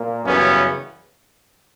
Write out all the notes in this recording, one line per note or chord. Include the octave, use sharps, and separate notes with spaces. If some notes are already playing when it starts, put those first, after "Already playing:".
Already playing: A#2 A#3
F#2 C#3 E3 G3 B3 C#4